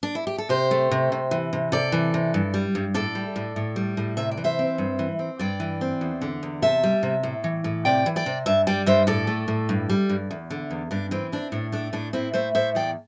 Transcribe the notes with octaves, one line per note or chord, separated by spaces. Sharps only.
D4
E4
G4
A4
C3 G4 C5
A3
C3
C3
E3
C3
C3 A4 D5
E3
C3
G2
G3
G2
A2 A4 D5
G3
A2
A2
G3
A2
C3 E5
D5
E3
C5 E5
C4
G2
E3
C4
G2 D5 G5
E3
C4
E2
D3
E2
C3 E5 A5
G3
C3
A2
E3
A2
C3 D5 G5
E3
D5 G5
C3
G2 E5 A5
G3 D5 G5
G2 C5 E5
A2 A4 D5
A3
A2
G2
G3
G2
E2
D3
E2
G2 D4
E3 C4
C4 D4
A2 D4
A3 D4
A2 D4
A2 C4 E4
A3 C5 E5
A2 C5 E5
E2 D5 G5